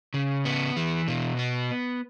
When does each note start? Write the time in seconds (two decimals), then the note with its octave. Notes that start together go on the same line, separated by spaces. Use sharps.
0.14 C#3
0.45 B3
0.77 E3
1.08 B2
1.39 B3